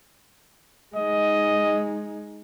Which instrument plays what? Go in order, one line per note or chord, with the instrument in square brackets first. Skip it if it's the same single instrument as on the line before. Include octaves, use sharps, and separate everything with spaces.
[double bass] G#3 D#4 [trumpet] D#5